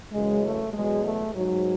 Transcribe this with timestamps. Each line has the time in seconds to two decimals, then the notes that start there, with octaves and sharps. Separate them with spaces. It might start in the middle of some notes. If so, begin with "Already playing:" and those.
0.12 F#2 C#3 E3 G#3
0.43 A3
0.73 E2 B2 F#3 G#3
1.05 A3
1.35 G#2 F#3